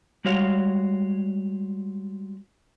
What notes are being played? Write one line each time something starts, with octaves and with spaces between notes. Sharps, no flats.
G3 G#3 F#4 C#5 F5